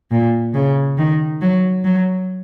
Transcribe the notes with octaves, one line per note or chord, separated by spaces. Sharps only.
A#2
C#3
D#3
F#3
F#3